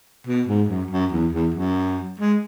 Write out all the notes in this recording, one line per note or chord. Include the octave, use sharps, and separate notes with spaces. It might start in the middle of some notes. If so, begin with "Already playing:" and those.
B2
G#2
F#2
F#2
E2
E2
F#2
G#3